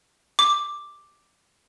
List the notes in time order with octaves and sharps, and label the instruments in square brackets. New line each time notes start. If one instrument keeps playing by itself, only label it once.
[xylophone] D6